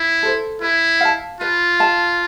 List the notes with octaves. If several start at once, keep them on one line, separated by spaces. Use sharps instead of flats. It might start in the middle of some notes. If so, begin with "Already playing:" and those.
Already playing: E4
A4 C5
E4 B4
F5 A5
F4 B4
F5 A5